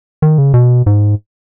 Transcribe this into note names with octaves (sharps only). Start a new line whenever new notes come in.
D#3
C#3
B2
G#2